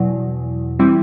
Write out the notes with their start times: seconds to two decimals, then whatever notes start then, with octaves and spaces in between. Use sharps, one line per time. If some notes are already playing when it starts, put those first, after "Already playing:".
Already playing: E2 B2 F#3
0.79 E3 G3 C4 E4